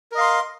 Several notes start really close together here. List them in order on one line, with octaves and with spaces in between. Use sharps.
A#4 D#5 F5 C6